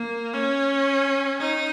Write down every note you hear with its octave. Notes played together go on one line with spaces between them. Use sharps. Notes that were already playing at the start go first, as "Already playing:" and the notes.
Already playing: A#3
C#4
D#4